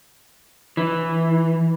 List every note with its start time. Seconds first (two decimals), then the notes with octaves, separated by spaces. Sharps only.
0.77 E3